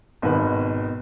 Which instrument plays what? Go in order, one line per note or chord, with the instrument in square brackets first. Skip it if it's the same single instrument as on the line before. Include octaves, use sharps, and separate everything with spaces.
[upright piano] G#1 B2 D#3 B4